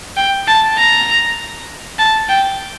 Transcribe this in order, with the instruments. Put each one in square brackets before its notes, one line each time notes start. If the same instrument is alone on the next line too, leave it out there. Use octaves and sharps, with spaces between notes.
[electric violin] G5
A5
A#5
A5
G5